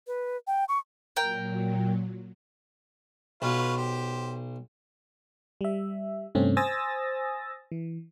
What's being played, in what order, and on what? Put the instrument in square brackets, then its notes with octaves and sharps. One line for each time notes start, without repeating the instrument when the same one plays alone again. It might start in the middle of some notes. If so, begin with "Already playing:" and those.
[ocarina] B4
G5
C#6
[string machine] A#2 F#3 [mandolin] A#4 G5
[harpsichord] B1 [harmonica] F4 B4 C#5
[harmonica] G4 C5
[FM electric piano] G3 E5
G2 C3 A3 C4 C#4
C5 G#5 D#6 E6 A6 A#6
E3